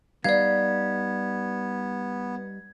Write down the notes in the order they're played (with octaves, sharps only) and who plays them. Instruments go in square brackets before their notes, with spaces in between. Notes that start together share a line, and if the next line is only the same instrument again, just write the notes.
[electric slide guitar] G3 D#4 [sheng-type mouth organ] B3 [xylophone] D5 F5 [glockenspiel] G#6